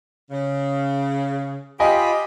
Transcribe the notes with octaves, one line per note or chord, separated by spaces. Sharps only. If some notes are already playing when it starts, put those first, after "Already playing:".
C#3
F4 G4 D#5 G#5 B5